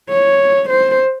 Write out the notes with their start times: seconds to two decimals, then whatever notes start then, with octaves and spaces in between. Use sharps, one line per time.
0.10 C#5
0.70 C5